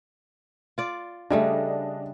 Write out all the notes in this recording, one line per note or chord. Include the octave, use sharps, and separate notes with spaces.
F4 D5
C#3 G3 A3 D4 D#5